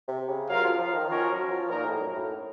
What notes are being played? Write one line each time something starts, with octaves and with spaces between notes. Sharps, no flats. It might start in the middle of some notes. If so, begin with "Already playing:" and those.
C3
C#3
F#3 F4 A#4 F5
F3
F3
D#3
F3 C#4 F#4 A#4 C#5
F#3
F3
A#2 A#3 D#4 A#4
A2
F#2
A2